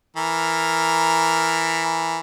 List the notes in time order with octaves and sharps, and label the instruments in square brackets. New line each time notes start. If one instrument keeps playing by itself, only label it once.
[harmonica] E3 A#4